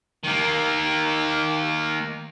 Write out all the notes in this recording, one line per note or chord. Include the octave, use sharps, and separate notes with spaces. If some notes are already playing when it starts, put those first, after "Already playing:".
D#3 A#3